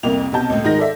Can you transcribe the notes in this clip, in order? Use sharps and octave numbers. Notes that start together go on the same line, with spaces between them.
C2 F2 A#3 F7
B1 C3 B3 A5 G6
C#2 A2
G#2 D#3 D#4 A#6
A4 D5 E5